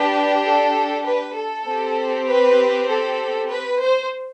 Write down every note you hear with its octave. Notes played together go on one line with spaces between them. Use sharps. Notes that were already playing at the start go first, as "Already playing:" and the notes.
Already playing: D4 G4 B4
A4
B4
A4
C4 G4
B4
A4
B4
C5